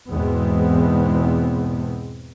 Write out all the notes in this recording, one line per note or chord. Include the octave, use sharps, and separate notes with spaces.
E2 G#2 B2 G#3 B3 C4